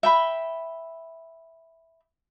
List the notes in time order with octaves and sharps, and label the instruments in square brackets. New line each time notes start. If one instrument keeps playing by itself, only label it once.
[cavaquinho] E5 G5 B5